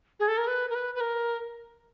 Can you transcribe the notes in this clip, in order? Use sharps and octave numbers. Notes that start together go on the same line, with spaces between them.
G#4
A4
A#4
B4
A#4
B4
B4
A#4